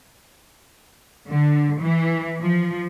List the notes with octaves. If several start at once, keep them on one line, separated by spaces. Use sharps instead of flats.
D3
E3
F3